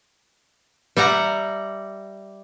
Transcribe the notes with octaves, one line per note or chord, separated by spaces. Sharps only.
G3 E5 F#5 A#5